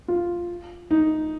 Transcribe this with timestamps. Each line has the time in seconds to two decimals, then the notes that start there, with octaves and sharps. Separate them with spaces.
0.08 F4
0.91 D#4